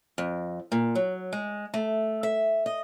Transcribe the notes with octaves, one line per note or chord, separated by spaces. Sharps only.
F2
A#2
F#3
G#3
A3
E5
D#5